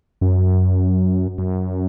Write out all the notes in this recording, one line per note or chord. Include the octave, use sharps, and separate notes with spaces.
F#2
F#2